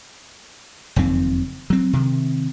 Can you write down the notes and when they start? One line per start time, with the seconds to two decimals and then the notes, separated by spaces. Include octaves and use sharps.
0.96 F#1 F2 D#3 C4
1.70 F#3 C4
1.93 C3 D#3